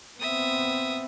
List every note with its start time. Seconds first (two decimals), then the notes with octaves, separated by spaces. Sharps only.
0.20 B3 C4 E5 D#6